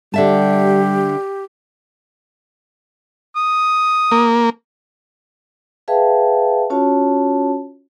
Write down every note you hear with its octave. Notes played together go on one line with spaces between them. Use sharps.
D3 G3 G4 E5 A5
D#6
A#3
G#4 B4 E5 F5 G5 A5
C#4 F4 F#4 C#5 A5